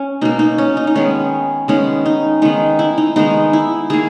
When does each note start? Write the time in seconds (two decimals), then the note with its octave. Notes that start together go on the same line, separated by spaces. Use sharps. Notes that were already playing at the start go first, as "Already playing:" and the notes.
Already playing: C#4
0.21 B2 A#3 D#4
0.39 D#4
0.58 C#4
0.77 D#4
0.87 D#4
0.95 D#3 G#3 B3 C#4
1.68 D#3 G#3 B3 C#4
2.06 D#4
2.42 D#3 G#3 B3 D#4
2.79 E4
2.98 D#4
3.16 D#3 G#3 B3 D#4
3.53 E4
3.90 D#3 A#3 G#4